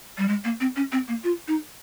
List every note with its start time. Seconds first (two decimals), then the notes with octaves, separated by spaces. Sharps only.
0.18 G3
0.28 G#3
0.44 A#3
0.60 C4
0.76 C#4
0.92 C4
1.08 A#3
1.24 F4
1.48 D#4